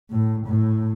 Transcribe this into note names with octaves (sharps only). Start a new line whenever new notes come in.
A2
A2